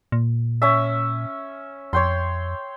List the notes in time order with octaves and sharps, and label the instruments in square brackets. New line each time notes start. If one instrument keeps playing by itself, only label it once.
[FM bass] A#2
[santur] C#4 E5
[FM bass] F2 [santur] C#5 G5 C6